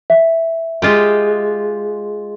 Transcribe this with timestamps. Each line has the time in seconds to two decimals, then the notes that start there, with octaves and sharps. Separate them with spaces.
0.10 E5
0.82 G#3 F4 G4